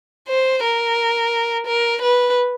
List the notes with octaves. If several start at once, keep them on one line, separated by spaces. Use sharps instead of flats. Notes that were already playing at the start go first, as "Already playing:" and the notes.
C5
A#4
A#4
B4